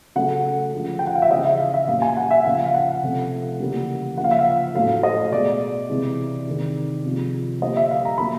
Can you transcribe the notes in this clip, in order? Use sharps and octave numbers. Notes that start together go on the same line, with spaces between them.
C#3 F#3 A3 F#5
D3 F3 G#3
G5
F#5
F5
E5
C#3 E3 G#3 D#5
E5
F5
E5
A#2 G3 A#3 F5
G#5
F#5
E5
C#3 F3 A#3 F5
F5
F#5
C3 F3 A3
C#3 E3 G3 A#3
C#3 F3 A#3 F#5
F5
E5
F5
A2 F#3 A3 F5
D#5
B2 G#3 D5
C3 E3 G#3
C3 D#3 G#3
C3 F3 G#3
D3 G3 A#3 D#5
E5
F5
A#5
D3 F#3 A#3 B5